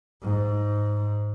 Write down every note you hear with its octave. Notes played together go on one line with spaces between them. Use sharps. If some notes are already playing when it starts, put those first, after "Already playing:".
G#2